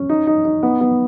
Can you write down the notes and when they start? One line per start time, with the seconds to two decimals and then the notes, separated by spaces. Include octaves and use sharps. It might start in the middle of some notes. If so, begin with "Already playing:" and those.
Already playing: C#4
0.09 D#4
0.27 D#4
0.45 D#4
0.63 B3
0.81 B3